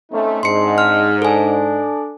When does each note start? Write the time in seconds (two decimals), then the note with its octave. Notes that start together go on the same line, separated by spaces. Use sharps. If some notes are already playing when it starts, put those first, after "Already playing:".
0.12 A3 C4 C#4 D#4
0.43 G#2 C4 D4 D#5 C6 C#7
0.78 F6
1.22 D4 A4 G#5